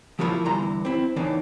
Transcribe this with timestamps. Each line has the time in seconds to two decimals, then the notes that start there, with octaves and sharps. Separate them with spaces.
0.19 F3 G3 A3 A#3 E4 F4
0.45 E2 G2 D3 E4 A#5 C6
0.85 C4 E4
1.16 E2 A2 D#3 E3 A#3 D4